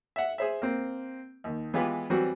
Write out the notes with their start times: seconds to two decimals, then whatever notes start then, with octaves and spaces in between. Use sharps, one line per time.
0.16 E5 F#5
0.38 G#4 C5 E5
0.62 A#3 C4
1.44 D#2 D#3
1.74 E3 G#3 B3 F4 G4 B4
2.10 E3 F#3 G3 C4 F#4